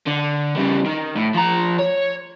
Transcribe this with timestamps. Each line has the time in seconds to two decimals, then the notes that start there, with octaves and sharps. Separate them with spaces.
0.06 D3
0.56 C#3 G3
0.86 D#3
1.16 A2
1.34 F3 A#5
1.79 C#5